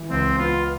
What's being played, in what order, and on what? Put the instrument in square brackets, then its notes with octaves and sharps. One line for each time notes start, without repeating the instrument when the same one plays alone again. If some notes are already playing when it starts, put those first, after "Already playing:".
Already playing: [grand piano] E3
[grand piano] C#2 [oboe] C4
[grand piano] B3 [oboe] F4